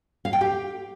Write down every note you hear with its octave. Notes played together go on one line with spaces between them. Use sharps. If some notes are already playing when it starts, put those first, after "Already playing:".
F5
G5
G4